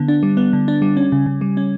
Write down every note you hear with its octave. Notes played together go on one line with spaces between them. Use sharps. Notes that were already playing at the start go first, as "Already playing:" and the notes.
Already playing: D3 B3
D4
G3
B3
D3
D4
G3
C#4
C#3
C#3
G3
C#4